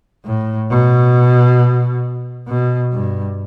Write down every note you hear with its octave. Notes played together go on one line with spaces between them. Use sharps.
A2
B2
B2
G2